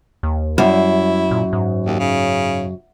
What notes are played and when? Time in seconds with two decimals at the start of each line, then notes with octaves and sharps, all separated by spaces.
0.23 D#2
0.58 F#2 G3 E4
1.31 A#2
1.53 G#2
1.86 D#2
1.99 C#3